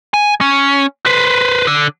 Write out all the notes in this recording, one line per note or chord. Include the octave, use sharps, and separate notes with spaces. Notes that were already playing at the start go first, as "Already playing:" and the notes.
G#5
C#4
B4 C5
D3